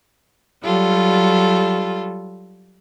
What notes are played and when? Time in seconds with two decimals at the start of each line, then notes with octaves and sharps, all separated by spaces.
0.62 F#3 G3 F4 A4